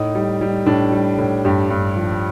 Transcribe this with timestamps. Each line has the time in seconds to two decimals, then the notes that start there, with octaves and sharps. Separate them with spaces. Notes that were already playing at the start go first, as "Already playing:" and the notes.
Already playing: A2 D#4
0.15 G3
0.41 G3
0.66 A2 D4
0.92 G3
1.19 A2
1.45 G2 G4
1.70 G2
1.96 F3